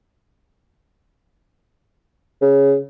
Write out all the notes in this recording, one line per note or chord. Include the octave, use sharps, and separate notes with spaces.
C#3